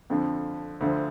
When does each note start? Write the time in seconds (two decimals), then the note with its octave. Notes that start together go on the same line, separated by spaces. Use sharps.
0.10 F2 D3 F3
0.81 D2 D3 F3